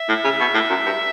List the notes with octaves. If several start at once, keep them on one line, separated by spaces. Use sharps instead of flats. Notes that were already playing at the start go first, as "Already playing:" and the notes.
Already playing: E5
A2
C#3
B2
A2
F#2
G2